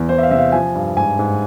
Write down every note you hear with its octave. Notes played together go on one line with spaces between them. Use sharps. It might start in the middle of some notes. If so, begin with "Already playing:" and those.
Already playing: E2
E3 C5
E5
F5
C3 E5
F5
F3 G#5
G2
G#2 G#5
G#2